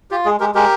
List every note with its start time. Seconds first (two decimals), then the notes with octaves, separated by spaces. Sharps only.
0.11 F4 G4
0.25 G#3 G#4
0.40 G#3 G4 A#4
0.55 G#3 G4 A#4